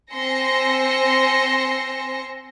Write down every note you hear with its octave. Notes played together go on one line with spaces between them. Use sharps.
C4 G#5 C6 E6 A#6 C#7